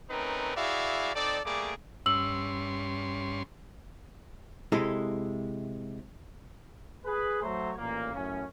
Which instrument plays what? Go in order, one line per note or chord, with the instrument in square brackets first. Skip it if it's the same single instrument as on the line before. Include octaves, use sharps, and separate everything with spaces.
[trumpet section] A3 C4 C#4 D#4 A#4 B4
E4 F#4 G#4 D5 E5 F5
C4 D#4 A4 D5
G3 A3 A#3 G#4 D5 D6
[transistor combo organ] G2 C#4 C6 [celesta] E6 F#7
[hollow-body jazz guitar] C3 G#3 E4 A4 D#5
[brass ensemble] G#4 B4
F#3 A3 C5 C#5 A#5
A1 A#2 A#3
F#2 A2 C#4